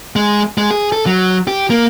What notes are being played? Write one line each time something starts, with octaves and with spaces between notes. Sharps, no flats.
G#3
G#3
G#4
A4
F#3
G4
A#3